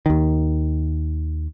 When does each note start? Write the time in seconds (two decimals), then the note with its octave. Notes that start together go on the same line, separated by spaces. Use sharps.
0.06 D#2 D#3